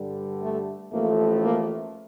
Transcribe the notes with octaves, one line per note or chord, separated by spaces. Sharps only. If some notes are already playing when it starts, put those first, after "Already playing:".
Already playing: G2 D3 G3
A3
A1 A2 F3 A3 A#3
A#3